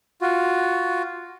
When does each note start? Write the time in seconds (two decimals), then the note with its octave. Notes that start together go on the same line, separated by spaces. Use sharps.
0.21 F4 F#4